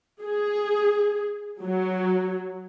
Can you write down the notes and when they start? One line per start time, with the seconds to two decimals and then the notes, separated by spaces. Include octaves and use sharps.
0.22 G#4
1.63 F#3